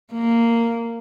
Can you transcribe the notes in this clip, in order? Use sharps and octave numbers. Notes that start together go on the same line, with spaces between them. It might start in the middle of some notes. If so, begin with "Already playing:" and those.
A#3